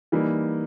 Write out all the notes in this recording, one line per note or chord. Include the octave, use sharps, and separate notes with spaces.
E3 G3 A#3 D#4